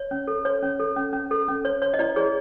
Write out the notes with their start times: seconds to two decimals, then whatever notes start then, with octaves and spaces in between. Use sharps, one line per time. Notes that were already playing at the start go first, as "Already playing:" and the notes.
Already playing: C#5
0.11 C#4
0.27 A4
0.45 C#5
0.62 C#4
0.80 A4
0.96 C#4
1.13 C#4
1.31 A4
1.48 C#4
1.65 C#5
1.82 C#5
1.94 D#5
1.99 E4 D5
2.16 G#4 C#5